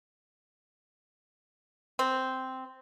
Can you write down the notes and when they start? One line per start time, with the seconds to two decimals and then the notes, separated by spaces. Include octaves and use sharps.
1.99 C4